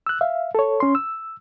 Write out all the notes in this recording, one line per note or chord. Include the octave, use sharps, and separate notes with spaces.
E6 F#6
E5 F5
A4 C#5
C#4 C6
E6